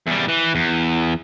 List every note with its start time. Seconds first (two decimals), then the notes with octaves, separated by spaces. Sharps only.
0.07 E2 G3
0.29 E3
0.55 E2